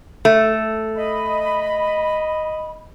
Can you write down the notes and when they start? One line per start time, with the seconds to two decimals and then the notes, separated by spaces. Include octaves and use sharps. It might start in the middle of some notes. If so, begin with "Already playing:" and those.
0.25 A3
0.97 D#5 B5